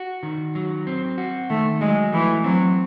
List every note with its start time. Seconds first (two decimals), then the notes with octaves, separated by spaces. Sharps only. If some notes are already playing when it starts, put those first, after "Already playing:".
Already playing: F#4
0.23 D#3
0.55 F#3
0.87 C4
1.18 F#4
1.50 D#3 A3
1.81 F#3 G#3
2.12 E3 A3
2.44 F#3 C4